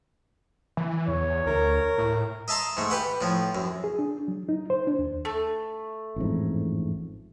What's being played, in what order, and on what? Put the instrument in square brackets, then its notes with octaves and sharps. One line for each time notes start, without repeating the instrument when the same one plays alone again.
[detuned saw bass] E3
[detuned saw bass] E2 [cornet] C#5
[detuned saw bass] D2 [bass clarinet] A#4
[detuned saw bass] A2
[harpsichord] D#5 E5 A5 A#5 C6
G#2 A3
G4 B4 F#5
A2 F3
F#2
[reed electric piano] G#4
D4
F#3
D#4
C5
D4
D#2
[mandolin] A3
[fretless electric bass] A1 F2 G#2